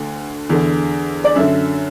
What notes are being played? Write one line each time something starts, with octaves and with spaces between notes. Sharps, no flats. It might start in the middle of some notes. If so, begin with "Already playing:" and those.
Already playing: D2 D3
E2 D3
D5
F#2 D3 E5